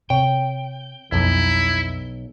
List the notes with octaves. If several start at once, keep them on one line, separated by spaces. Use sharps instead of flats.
C3 C#5 G5
B1 F2 E4